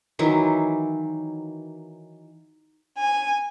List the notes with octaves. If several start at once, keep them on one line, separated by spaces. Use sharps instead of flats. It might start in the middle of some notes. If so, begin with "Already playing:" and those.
D#3 E3 F#3 E4
G#5